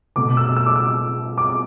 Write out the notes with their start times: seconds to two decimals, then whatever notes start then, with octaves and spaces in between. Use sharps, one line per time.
0.16 B2 A3 D6
0.37 E6
0.56 E6
0.66 D6
0.76 E6
1.38 D6